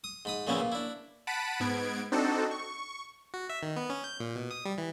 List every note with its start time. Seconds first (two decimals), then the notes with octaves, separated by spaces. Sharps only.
0.04 D#6
0.25 G#2 B5 D#6
0.47 A#2 C#3 F3 B3 C#4 E4
0.60 A#2
0.72 D4 E4
1.27 F#5 A5 B5 B6 D7 D#7
1.60 G#2 B3 G#6 D7
2.12 C4 D4 D#4 F#4 A4
2.51 C#6
3.34 F#4
3.50 E5
3.63 D#3
3.76 B3
3.90 C#4
4.04 G6
4.20 A#2
4.36 B2
4.51 D#6
4.65 G3
4.78 E3